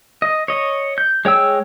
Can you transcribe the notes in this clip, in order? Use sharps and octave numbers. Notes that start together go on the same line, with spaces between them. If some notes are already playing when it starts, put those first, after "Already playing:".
D#5
C#5 D#5
G6
G#3 C#5 G5 E6